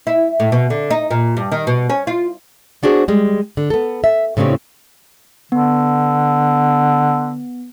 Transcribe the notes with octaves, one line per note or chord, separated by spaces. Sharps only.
E4
A2
B2
D3
D#4
A#2
G2
D#3
B2
C#4
F4
B3 D4 F#4 G#4 C5
G3 G#3
D3
B3 A4
E5
A2 C#3 C4 D4 G4
D3 B3